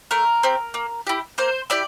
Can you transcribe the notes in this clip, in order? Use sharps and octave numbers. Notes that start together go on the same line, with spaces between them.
A3 A#4
C4 G4
A#3
E4 G4
A#3 C5
E4 G4 D5